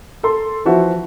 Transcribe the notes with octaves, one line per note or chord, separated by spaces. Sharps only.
A4 C6
E3 F3 F#4 E5